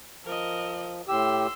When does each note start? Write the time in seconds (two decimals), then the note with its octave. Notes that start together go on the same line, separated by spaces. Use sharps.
0.25 F3 A#4 D#5
1.08 A2 G4 C6 E6